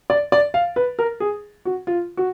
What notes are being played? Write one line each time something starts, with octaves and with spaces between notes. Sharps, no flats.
D5
D5
F5
B4
A#4
G#4
F#4
F4
F#4